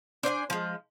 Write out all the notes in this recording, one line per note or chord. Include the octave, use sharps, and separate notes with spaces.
D4 C5 D#5 G#5
F3 G#3